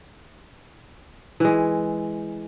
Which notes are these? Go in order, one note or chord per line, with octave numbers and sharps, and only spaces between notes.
E3 G#3